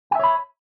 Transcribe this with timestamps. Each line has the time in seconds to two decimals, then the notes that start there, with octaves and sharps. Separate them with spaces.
0.11 G5
0.15 E5
0.20 C#5
0.24 B5